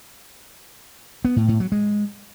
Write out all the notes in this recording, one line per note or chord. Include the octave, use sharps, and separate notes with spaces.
B3
A2
A2
F#3
G#3